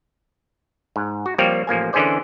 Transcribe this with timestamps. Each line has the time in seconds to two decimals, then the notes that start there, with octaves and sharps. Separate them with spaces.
0.96 G#2
1.26 F#4
1.38 F3 G3 A#3 C4 C#5 D5
1.67 A1 F3 A#3 G#5
1.93 D3 E3 C#4 G#4 C5 D5